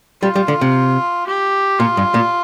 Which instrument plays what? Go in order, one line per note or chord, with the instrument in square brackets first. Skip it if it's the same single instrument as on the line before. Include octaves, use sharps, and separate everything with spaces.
[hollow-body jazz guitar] G3 [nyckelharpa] F4
[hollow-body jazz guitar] G3
D3
C3
[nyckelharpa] G4
[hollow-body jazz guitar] A#2 [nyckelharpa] F4
[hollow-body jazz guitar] G2
A#2